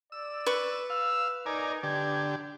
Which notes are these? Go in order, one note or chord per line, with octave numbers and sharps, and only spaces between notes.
D5 E6
B4 C#6
F5 E6
D#4 A#4 D5 G#5
D3 G4 G#6